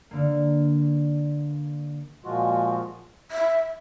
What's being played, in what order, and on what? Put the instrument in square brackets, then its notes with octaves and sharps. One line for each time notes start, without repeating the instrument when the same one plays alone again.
[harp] D3 A#3
[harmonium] A#2 F3 G#3 F4 F#4
[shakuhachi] E5